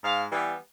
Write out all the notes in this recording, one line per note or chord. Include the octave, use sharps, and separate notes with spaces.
G#2 F5
E3 G3 B3